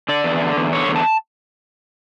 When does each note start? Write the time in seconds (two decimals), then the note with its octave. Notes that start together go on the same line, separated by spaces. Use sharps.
0.09 D3 D5
0.24 E2
0.41 D3
0.57 E2
0.73 D3 C#5
0.89 E2
0.96 A5